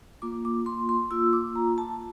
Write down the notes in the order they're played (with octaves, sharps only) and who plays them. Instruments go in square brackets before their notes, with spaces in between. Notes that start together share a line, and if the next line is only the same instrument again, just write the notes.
[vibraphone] A#3 F4 D6
D6
C6
C6
A#3 F4 E6
D6
A#5
A5